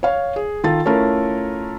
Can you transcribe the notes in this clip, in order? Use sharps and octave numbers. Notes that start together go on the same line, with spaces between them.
C#5 F5
G#4
D#3 F4 A4 A6
A3 C#4 E4 F4 A4 A#4